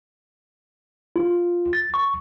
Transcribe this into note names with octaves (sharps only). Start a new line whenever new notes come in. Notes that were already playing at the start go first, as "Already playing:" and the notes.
F4
A6
C#6